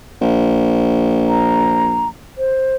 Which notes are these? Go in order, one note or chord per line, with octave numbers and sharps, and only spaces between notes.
A#1
A#5
C5